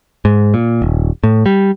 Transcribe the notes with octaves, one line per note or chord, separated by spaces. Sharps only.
G#2
A#2
D#1
A2
G3